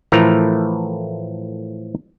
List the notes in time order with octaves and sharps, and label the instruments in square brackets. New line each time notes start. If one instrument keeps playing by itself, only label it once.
[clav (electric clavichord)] A2 E3 F3 A3 A#4 A#5